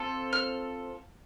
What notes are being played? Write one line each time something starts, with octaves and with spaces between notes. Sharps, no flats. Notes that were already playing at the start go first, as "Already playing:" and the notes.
Already playing: C4 F4 A4
F6